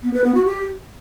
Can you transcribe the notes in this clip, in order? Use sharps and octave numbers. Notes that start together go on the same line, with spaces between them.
B3
B4
B3
F#4
G4